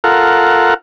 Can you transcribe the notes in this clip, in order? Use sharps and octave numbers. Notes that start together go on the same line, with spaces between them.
F4 A4 A#4 F#5